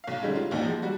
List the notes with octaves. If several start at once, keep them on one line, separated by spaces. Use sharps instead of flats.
B1 F5
D3 D#3 G3 G#3 C#4
F4
A#1 D#2 A#3 D#4 F#4
F3 G#3
G3 F#4